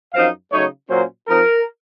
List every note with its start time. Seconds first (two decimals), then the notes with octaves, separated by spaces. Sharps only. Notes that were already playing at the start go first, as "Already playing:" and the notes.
0.14 F#2 F3 C4 D#4 F5
0.52 C#3 F#3 A3 D#4 C#5
0.90 A#2 F#3 A#3 C#4 C5
1.28 F3 C4 D#4 A#4